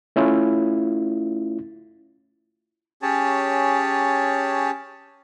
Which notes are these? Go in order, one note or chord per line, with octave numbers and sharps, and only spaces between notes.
A3 C#4 E4 F4
C#4 G4 G#4 C#5 A5